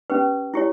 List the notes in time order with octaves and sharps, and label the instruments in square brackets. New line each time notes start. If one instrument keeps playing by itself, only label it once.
[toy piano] C#4 G4 B4
E4 G4 C#5